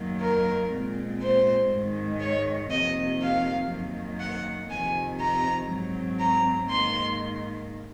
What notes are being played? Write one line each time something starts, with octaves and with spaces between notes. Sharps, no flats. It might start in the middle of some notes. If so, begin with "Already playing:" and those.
Already playing: F#2 D#3 F#3 A#3
A#4
A#2 G#3 C4
C5
G#2 D#3 G#3
C#5
F2 C3 D#3 A#3 D#5
F5
F#2 D#3 A#3
F#5
F2 C3 D#3 G#5
A#5
G#2 F#3 C4
A#5
G#2 D#3 A#3 C6